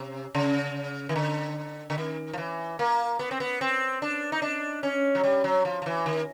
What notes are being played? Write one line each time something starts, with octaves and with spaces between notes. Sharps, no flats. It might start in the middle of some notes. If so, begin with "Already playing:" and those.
Already playing: C3
C#3
D#3
D3
D3
D#3
F3
E3
A#3
B3
C4
B3
C4
D4
D#4
D4
C#4
F#3
G3
F#3
F3
F3
E3
D#3